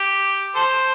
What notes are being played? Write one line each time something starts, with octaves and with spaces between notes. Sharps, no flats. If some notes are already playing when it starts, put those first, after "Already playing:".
Already playing: G4
A4 C5